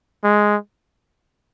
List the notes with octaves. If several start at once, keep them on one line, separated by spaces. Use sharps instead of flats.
G#3